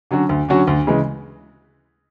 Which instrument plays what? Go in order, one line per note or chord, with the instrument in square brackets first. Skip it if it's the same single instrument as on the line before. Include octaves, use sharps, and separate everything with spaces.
[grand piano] D3 F#3 C#4 F#4
D2
D3 F#3 C#4 F#4
D2
C#3 E3 G#3